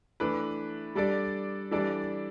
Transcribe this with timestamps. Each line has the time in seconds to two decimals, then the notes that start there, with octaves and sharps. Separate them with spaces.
0.20 E3 A3 D4 B4
0.95 G3 D4 A4 D5
1.71 E3 G3 D4 A4 D5